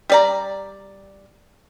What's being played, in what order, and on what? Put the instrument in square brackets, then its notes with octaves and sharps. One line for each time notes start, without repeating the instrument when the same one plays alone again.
[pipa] G3 D5 A#5